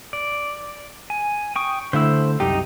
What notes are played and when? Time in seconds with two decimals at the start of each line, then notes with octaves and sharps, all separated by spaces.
0.13 D5
1.10 G#5
1.56 G5 C#6 D#6
1.93 D3 A3 E4 C5 E6
2.40 C2 F#2 D#4 G4